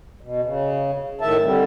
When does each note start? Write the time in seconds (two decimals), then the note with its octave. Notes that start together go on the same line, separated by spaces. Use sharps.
0.21 B2
0.43 C#3
1.21 A2 D#3 E5 A5
1.43 D3 G3 C4